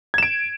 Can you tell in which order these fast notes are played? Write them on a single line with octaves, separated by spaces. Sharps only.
G#6 E7 D7